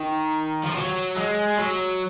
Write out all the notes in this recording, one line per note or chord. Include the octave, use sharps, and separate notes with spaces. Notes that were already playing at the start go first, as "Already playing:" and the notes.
Already playing: D#3
F3
F#3
G#3
F#3